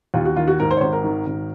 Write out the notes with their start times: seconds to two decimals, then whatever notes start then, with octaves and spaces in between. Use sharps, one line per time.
0.14 D#2 F4
0.25 F#4
0.36 D#3 F4
0.48 F#4
0.60 G#2 A#4
0.71 C5
0.77 C#5
0.81 G#1 C5
0.93 A#4
1.04 D#3
1.27 G#1